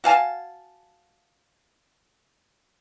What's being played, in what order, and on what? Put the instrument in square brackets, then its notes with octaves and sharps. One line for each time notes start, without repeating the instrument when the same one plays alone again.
[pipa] F#4 F5 G#5 A5